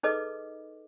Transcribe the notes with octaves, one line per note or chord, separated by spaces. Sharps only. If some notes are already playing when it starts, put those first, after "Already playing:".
D#4 G#4 A4 B4 D#5 D6